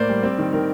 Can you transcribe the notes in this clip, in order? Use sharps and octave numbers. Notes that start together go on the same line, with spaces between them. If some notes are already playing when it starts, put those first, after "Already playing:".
Already playing: A2 A#3 C5 D5
G3
C4
D#3
D#3 A#4